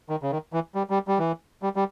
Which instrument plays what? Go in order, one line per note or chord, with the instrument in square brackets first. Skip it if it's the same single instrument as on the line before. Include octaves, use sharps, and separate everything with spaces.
[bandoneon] D#3
C#3
D#3
E3
G3
G3
G3
E3
G3
G3